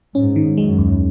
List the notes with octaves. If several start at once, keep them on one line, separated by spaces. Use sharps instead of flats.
G#2 C#4
D#3
F#2 G#3
D#2